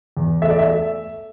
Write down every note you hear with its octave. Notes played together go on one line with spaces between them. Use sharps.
E2
A3 E5
D5
E5
A3